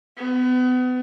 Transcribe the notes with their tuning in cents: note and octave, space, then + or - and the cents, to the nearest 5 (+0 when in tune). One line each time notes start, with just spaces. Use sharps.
B3 +35